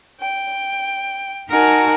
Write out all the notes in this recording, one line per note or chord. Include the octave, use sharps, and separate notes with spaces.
G5
D#4 F#4 A#4 F#5 G#5 A5